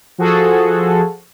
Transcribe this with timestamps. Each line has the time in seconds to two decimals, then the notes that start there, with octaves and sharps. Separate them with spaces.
0.18 F3 F#4 G#4 A4